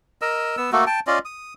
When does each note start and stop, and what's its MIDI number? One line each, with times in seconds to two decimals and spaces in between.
0.22 0.56 70
0.22 0.56 75
0.22 0.56 88
0.57 0.70 59
0.57 0.70 88
0.72 0.85 57
0.72 0.85 58
0.72 0.85 66
0.72 0.85 69
0.87 1.00 79
0.87 1.00 81
1.07 1.19 61
1.07 1.19 65
1.07 1.19 74
1.07 1.19 75
1.25 1.54 87